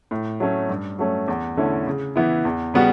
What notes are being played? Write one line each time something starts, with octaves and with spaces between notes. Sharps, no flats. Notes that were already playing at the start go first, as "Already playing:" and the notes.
A2
F#3 A3 C#4
G2
F#3 A3 C#4
E2
D3 A3 C#4 E4
C#3
E3 B3 E4
E2
C#3 G3 B3 F#4